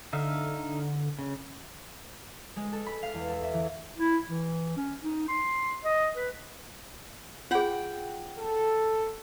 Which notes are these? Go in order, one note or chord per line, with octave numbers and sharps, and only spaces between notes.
D3 D#4 E5 F5
C#3
G#3
A4
B5
F5
E2
A4
E5
E3
E4
E3
C#4
D#4
C6
D#5
B4
F4 G#4 F#5 G5
A4